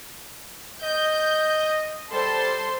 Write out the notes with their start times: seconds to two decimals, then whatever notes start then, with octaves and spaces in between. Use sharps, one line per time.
0.83 D#5 G6
2.12 G3 A4 C5 A5 C6